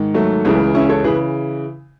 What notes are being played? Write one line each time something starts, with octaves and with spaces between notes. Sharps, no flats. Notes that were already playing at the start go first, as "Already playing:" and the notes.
Already playing: G#2 D#3
F#3 A3
C#2 C#3 E3
C#4 E4
A4 C#5
C#3 E3 G#4 B4